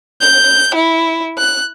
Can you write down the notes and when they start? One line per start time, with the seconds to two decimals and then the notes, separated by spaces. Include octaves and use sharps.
0.21 G6
0.75 E4
1.38 F#6